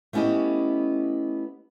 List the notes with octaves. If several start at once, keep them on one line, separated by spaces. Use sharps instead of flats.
A3 B3 C#4 E4 G4 D#5